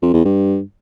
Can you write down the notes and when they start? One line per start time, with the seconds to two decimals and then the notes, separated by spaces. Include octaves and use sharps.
0.02 F2
0.13 E2
0.25 G2